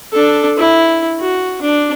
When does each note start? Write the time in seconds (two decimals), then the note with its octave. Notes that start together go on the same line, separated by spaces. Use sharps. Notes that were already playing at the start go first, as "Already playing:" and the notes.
0.13 D4 A4
0.57 E4
1.20 F#4
1.62 D4